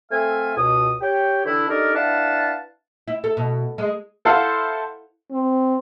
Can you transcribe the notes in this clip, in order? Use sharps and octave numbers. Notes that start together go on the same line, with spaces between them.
A3 C4 A4 E5 F5 G#5
C#2 B2 D#6
G4 C#5 G5
D3 E3 D4 E4
D4 D#4 G4 A4 A#4
D4 E4 B4 F5 F#5 A5
E4
A4
B2
G#3
E4 A4 C5 F5 F#5
C4